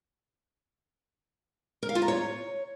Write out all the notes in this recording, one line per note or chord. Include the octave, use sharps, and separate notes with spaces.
A#4
F5
F4
A#5
C#5